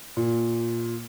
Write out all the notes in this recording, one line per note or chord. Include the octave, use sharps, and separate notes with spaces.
A#2